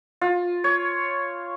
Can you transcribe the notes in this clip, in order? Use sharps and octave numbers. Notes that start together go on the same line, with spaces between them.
F4
C#5